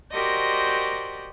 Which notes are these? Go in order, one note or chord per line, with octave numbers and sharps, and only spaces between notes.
F#4 G4 A#4 C5 D5 D#5